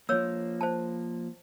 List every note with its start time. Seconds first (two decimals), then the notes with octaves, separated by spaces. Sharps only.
0.09 F3 A#3 C#5 E6
0.61 C5 A5